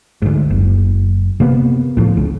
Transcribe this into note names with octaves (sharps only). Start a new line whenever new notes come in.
D2 G#2
F#1
C3 A#3 B3
C#2 A2 F3
C#2